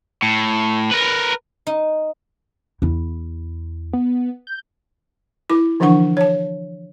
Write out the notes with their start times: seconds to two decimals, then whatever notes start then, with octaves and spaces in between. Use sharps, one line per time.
0.23 A2
0.92 A#4 B4
1.67 D#4
2.82 E2 E4
3.93 B3
4.47 G6
5.50 E4 D6
5.80 D3 E3 F3 D4 F#5 C#6
6.17 C#5 A5